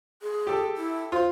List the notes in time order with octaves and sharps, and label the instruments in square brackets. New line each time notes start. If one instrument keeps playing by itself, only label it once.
[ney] G#4
[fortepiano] G4 A4
[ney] E4
[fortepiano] F4 [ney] C5